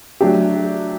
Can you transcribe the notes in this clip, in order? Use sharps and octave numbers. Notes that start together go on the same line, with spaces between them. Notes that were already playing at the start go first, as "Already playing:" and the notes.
F#3 A3 D4 G4